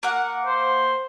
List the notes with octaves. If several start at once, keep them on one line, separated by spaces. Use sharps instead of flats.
A#3 F#5
C5